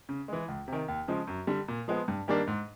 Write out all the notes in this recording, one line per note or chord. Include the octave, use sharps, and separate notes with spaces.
C#3
E3 G#3
C#2
C3 D#3
D#2
C#3 F3 G#3
F#2
D3 G3
A#2
F3 G#3 B3
G2
D#3 G3 A#3 D4
G#2